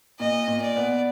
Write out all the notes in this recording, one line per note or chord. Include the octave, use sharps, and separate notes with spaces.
A#2 D#5
A#2
D5
B3